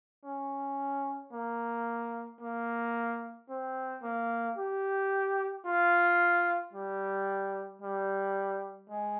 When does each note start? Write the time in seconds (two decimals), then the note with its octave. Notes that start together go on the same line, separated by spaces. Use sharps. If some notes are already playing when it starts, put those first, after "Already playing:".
0.24 C#4
1.32 A#3
2.40 A#3
3.49 C4
4.03 A#3
4.57 G4
5.65 F4
6.73 G3
7.81 G3
8.90 G#3